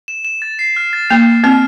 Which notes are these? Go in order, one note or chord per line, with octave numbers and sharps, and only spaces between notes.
E7
E7
A6
C7
F6
A6
A#3 C7
A6
C4 F6